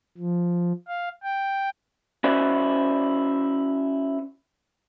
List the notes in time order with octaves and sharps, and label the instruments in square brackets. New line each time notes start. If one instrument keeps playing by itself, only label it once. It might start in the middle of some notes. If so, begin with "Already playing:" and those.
[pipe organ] F3
F5
G5
[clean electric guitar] C#4 E4 F#4 C5 D5